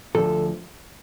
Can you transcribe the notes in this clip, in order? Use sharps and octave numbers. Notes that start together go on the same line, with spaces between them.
D2 D3 F3 A4